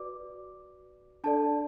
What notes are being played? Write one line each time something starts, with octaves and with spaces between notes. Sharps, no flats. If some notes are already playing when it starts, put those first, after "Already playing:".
Already playing: F#4 B4 D5 D6
D4 A4 D5 A5